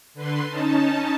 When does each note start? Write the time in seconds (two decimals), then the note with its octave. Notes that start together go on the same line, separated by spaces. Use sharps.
0.14 D3 B4 C6
0.47 C#4 D#4 A5